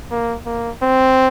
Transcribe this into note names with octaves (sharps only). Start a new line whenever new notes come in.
A#3
A#3
C4